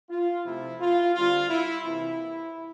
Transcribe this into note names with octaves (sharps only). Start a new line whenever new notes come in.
F4
C3 F3 A3 C4 E4
F4
D3 G3 C4 F4
E4
C3 E3 A#3 E4